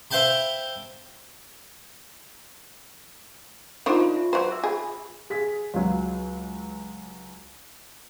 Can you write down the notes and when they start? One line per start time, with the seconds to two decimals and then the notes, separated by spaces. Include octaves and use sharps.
0.11 C5 E5 F5 G5 A5 B5
3.86 D#3 D4 F4 C5 D5
3.98 G#4 F5 A5
4.15 F4 E5
4.33 F#3 B4 C5
4.50 G#4 E5 E6
4.64 D#4 G4 G#4 B5
5.30 G#4 B6
5.74 C#2 F#3